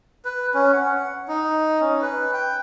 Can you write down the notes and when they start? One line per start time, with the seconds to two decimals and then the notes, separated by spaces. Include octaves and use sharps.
0.25 B4
0.54 C#4
0.73 F#5
1.28 D#4
1.81 C#4
2.02 B4
2.34 G5